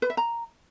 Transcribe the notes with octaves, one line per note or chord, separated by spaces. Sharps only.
B4
E5
A#5